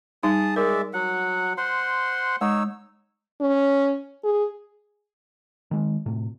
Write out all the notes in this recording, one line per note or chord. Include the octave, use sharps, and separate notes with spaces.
G3 D#4 G#4 A5 D#6
G#3 A#4 D5 E5
F#3 F#5
C5 F#5 C6
G#3 D#4 C#5 E6
C#4
G#4
D#3 G#3
A2 C3